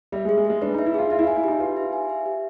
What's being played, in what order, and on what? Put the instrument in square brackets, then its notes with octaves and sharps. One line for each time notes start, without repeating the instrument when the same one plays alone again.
[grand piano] G3 [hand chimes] E5
[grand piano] G#3
[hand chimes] G#4
[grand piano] G#3
[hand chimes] G#4
[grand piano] G#3
[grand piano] D4 [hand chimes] B4
[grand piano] D#4
[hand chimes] E5
[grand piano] E4
[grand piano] F4 [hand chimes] G#4
[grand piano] F4 [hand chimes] E5
[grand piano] E4
F4
[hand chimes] G#5
[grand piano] E4
[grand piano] D#4 [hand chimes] G4
[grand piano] F4 [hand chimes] B4
[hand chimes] E5
G#5
E5
G4